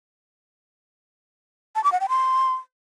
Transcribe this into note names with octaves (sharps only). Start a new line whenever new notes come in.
A5
D6
F#5
G5
C6